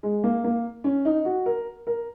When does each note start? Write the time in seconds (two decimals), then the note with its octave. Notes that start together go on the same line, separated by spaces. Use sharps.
0.03 G#3
0.24 A#3
0.44 A#3
0.84 C#4
1.05 D#4
1.25 F#4
1.46 A#4
1.87 A#4